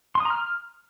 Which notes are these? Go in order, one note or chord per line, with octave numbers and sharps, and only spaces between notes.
C6
D#6
A#5
F6